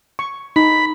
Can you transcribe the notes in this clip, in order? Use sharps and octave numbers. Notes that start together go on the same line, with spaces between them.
C#6
D#4 B5